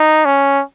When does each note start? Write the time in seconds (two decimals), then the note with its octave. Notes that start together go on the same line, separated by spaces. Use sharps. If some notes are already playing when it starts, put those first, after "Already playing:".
Already playing: D#4
0.25 C#4